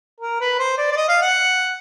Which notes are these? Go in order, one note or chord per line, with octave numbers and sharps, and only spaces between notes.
A#4
B4
C5
D5
D5
D#5
F5
F#5